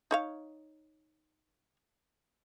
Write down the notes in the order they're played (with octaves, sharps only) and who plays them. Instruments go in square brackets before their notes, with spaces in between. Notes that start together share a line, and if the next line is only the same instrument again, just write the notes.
[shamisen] D#4 C#5 F5